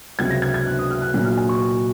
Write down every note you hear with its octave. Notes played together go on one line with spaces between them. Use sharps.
C#2 C3 F#3 G#6
A#6
G#6
G#6
F#6
D#6
F6
F#6
A#2 F#3 C#4 F#6
F6
G#5
C#6